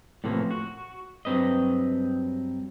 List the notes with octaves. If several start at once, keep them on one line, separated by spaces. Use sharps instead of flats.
A2 C3 E3 F3 A#3 C#4
F#4
G2 F#3 C4 B4 D#5